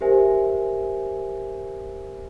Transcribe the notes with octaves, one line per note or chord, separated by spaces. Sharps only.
G4 A#4 C5 E5 G#5